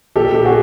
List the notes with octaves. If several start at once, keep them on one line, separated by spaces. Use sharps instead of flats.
A#2 G4 A4
G4
F#4 G#4